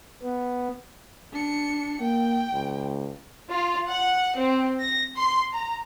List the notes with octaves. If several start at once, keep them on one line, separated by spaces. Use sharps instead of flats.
B3
D4 C#7
A#3 G5
C#2
F4
F#5
C4
A#6
C6
A#5